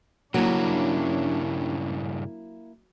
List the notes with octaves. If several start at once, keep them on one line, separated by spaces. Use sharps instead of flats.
G2 C#3 F#3 A#3 C#4 D4 E4